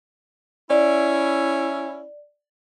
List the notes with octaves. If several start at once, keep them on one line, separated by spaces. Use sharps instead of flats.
C#4 E4 D5